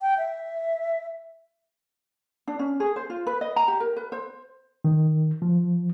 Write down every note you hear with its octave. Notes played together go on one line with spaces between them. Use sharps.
G5
E5
D4
C#4
G#4
C5
F4
B4
D#5
A#5
G4
A#4
B4
C5
D#3
F3